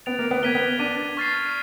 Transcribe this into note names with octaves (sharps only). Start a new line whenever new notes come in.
B3 A6 D7 F7
A#3
B3
A#3 G#6 B6 D#7 G7
B3
D4 F#6 B6 D#7
C#6 F6 A6 C7